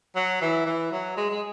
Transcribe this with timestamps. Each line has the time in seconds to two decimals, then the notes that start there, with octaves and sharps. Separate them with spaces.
0.16 F#3
0.42 E3
0.66 E3
0.92 F#3
1.17 G#3
1.30 G#3